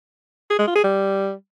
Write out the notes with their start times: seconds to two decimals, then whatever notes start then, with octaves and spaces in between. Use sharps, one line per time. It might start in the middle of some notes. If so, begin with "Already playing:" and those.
0.50 G#4
0.59 G#3
0.67 F4
0.75 G#4
0.84 G3